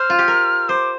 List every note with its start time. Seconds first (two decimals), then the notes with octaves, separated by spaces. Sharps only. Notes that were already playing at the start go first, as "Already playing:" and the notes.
Already playing: C5 F6
0.10 F4
0.19 G4
0.28 A#4
0.69 C5 D6